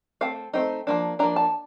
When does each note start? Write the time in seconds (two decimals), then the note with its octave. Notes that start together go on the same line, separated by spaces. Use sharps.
0.21 A3 C4 F5
0.54 A3 C4 D#4
0.87 F3 A#3 D4
1.19 F3 A#3 D4 A#5
1.36 A5